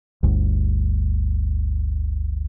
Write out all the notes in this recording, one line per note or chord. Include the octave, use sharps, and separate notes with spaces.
G1 D2